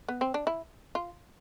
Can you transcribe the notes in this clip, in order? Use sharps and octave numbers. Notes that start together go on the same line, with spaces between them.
B3
C4
D4
E4
F4